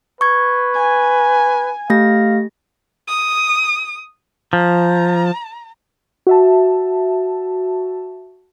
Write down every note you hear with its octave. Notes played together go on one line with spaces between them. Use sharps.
B4 C#6 G#6
G#5
A3 G4 F5 A#6
D#6
F3 A#5
F#4 E5 A5